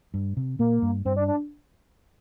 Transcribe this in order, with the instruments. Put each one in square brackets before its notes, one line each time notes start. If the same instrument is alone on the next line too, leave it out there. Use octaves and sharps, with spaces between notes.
[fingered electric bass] G2
C3
[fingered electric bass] A#2 [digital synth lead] A#3
[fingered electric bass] G2
[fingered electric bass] G2 [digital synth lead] C4
[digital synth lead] D4
D4